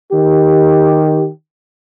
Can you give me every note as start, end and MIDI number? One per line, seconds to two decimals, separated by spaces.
0.13 1.28 51
0.13 1.28 67